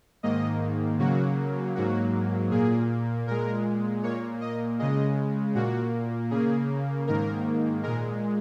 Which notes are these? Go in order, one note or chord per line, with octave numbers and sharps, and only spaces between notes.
G#2 D#3 A#3 D#5
C#3 F#3 A#3 F#4
G#2 F#3 A#3 F#4
A#2 A#3 G#4
A#2 G#3 A#4
A#2 A#3 C#5
D#5
C#3 G#3 D#5
A#2 A#3 F#4
C#3 A#3 G#4
G#2 D#3 A#3 A#4
A#2 G#3 A#4